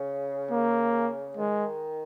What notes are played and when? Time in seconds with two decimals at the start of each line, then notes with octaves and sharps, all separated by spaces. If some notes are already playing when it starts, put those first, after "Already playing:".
Already playing: C#3
0.51 A#3
1.37 D#3 G#3